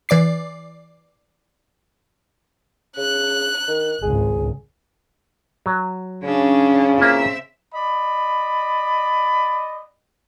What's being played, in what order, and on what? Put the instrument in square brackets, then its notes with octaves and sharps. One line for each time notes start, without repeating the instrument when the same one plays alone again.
[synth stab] E3 D5 D6 C7
[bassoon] C#3 [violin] F#6
[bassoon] D#3
[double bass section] G#1 C#2 [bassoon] G#4
[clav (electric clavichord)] F#3
[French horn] C#3 [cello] C#4 D4
[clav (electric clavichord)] A#3 E4 F4 [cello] C4 E5
[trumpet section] D5 D#5 B5